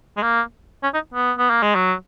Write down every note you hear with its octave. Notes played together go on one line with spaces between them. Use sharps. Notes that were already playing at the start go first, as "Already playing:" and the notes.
G#3
A#3
C#4
D#4
B3
B3
A#3
G#3
F#3